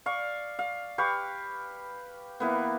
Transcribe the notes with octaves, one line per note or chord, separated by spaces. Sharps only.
D5 F5 C#6
F5
G4 B4 F5 C#6
E3 A#3 B3